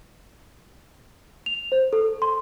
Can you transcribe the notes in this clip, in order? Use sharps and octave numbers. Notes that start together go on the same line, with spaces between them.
F7
C5
A4
C6